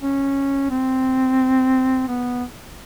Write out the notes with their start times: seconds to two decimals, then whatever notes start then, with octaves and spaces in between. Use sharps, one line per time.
0.02 C#4
0.70 C4
2.08 B3